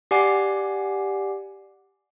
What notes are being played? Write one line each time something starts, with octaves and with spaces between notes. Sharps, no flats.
G4 D5 F#5 G#5 D6 C7